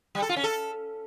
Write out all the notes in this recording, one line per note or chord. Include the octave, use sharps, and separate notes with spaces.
G3
A4
F4
C#4
A4